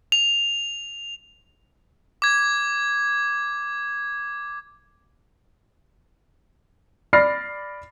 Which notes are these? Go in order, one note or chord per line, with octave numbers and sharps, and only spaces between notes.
F7
D6 G#6
D5 B5 F6 A6 A#6 C7